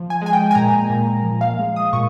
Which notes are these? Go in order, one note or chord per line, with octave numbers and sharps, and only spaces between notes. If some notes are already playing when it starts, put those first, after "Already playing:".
Already playing: F3
G#5
G#3 G#5
G5
G#5
A#2 A#5
A#2
F3
F5
G#3
D#6
A#2 C#6